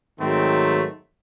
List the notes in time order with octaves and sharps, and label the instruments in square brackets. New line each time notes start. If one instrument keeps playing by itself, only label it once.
[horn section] G#2 D#3 F#3 A3 C4